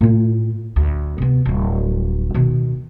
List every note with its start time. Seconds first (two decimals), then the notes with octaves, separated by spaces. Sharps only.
0.01 A2 F4
0.76 D2
1.18 C3 B3
1.46 D1 G3
2.34 B2 D#3